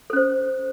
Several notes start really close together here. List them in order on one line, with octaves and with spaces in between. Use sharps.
A4 C#4 C5